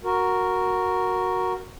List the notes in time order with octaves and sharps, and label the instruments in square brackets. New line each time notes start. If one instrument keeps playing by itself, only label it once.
[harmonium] F#4 A#4